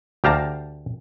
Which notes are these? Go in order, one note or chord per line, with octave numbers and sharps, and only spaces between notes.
D2 G4 F5 A5 A#5